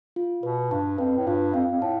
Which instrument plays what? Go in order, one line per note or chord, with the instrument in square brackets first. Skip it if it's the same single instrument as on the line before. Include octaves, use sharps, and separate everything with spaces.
[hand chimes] F4
[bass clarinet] B2 [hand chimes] B4
[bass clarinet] G2 [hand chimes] A5
[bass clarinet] F2 [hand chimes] B4
[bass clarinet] A2
[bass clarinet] G2 [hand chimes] F4
[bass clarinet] F2 [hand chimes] F5
[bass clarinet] F2
[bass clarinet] A2 [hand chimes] A5